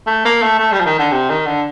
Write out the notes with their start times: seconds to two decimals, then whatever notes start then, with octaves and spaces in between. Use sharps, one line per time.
0.07 A3
0.25 A#3
0.42 A3
0.59 A3
0.73 G3
0.81 F3
0.86 D#3
0.99 D3
1.12 C3
1.30 D#3
1.46 D3